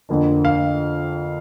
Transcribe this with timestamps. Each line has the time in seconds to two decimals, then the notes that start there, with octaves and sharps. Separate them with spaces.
0.09 F2 D3 A#3 D4
0.45 F5